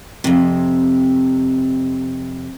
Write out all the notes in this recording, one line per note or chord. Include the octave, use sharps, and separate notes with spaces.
F2 C3